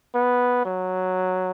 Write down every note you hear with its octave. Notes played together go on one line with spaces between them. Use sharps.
B3
F#3